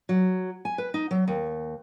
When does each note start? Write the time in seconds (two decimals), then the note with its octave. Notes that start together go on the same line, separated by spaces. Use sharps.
0.09 F#3
0.65 G#5
0.78 B4
0.94 D#4
1.11 F#3
1.28 D#2